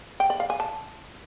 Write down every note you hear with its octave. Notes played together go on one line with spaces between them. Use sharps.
G5
D5
F5
G#5
A5